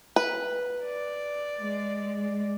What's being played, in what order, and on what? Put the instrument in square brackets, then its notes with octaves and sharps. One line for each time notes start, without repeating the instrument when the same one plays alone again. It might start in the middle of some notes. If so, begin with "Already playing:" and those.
[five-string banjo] B4
[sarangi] D5
[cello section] G#3